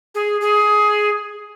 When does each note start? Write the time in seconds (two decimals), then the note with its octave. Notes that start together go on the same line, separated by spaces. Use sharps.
0.15 G#4
0.41 G#4